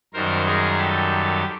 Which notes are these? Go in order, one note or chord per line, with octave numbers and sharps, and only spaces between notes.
F#2 D#3 G3 A#4 C5
G#4 A#4
G4 A4